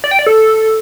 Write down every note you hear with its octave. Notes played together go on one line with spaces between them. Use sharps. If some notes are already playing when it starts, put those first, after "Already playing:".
D5
G5
D5
A4